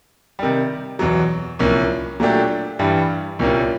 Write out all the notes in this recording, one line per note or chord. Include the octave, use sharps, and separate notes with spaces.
C3 D#3 G3
E2 B2 F#3
C2 A#2 F3 A#3 C#4
A#2 F#3 A3 D4 G4
G2 E3 G3
C2 A#2 G3 A#3 C#4